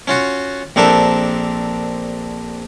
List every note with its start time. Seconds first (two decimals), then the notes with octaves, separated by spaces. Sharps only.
0.08 C#4 F4 F#4
0.76 A#1 C4 D4 A4 A#4 E5